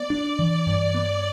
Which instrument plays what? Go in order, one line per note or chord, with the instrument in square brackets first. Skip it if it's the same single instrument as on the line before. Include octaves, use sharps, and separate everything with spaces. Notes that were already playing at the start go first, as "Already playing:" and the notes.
Already playing: [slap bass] B3 [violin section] D5
[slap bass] D4
E3
G2
B3